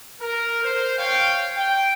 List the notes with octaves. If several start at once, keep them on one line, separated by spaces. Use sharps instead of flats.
A#4
C5
C#5 F5 G5
G5